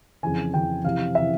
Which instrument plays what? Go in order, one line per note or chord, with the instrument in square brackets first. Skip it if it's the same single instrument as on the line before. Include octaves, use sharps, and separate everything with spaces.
[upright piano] F2 C#3 E3 G#5
F2 C#3 E3 G5
F2 C3 E3 F5
C3 E3 E5